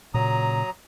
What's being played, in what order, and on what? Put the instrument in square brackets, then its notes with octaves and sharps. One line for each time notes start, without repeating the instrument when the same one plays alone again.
[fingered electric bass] A#2 C#3 [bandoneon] F#3 A#5 D#6